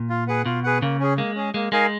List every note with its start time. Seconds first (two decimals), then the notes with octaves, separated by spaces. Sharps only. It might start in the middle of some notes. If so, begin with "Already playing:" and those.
Already playing: A#2
0.10 F4
0.28 G#4 B4 F#5
0.45 B2 F4
0.64 G#4 B4 F#5
0.82 C#3 A#3
1.00 C#4 G#4
1.17 G#3 A#3
1.35 C#4 G#4
1.54 G#3 A#3
1.72 G#3 D#4 A#4 F5 G#5